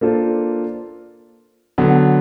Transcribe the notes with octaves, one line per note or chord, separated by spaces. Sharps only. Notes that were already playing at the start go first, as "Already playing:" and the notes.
A#3 D4 F4 A4 C5
D3 F#3 B3